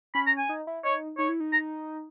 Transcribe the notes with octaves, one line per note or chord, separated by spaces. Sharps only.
C#4 B5
A#5
G#5
D#4
E4
D#4 C#5
D#4 C#5
E4
D#4
A#5